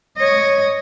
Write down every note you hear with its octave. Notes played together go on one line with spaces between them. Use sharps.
C#5 D#5